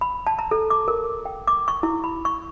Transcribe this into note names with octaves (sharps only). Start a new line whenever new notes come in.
B5
A5
A#5
A4
D6
A#4
G5
D6
C#6
E4
B5
C#6